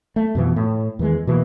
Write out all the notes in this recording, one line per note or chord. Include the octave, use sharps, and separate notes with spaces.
A3
F2 B2 E3
A2
E2 D#3 E3 G#3
B2 E3 A3 A#3